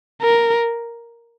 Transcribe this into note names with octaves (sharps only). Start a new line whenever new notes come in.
A#4